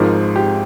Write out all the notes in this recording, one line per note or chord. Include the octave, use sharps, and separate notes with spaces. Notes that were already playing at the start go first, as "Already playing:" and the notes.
Already playing: G#1 G#2 F3 A#4
G4